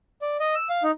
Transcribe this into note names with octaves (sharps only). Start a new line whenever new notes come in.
D5
D#5
E6
F5
D#4